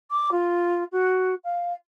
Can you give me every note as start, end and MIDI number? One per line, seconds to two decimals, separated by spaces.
0.11 0.31 86
0.32 0.84 65
0.92 1.35 66
1.44 1.73 77